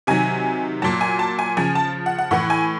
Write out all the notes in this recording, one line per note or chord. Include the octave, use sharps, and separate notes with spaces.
C3 D#3 F#3 G#5
A#2 F#3 A5
G#5
A5
G#5
C#3 F3 G#5
A5
F#5
F#5
A2 E3 F#5
G#5